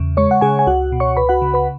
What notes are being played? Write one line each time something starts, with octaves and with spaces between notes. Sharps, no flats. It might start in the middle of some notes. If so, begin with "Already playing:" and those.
Already playing: E2 C#3
G#3 C#5 C#6
F#5
C#3 G#4 G#5
G#5
C#2 F#4 F#5
B2
C#5 C#6
C#2 B4 B5
F#4 F#5
C#3
B4 B5